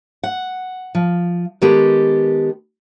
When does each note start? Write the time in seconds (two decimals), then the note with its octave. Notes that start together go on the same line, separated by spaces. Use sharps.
0.23 F#5
0.95 F3
1.62 D#3 G#3 B3 G4 A4